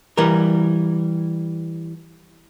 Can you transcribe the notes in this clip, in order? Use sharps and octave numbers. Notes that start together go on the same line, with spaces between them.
E3 G3 A#4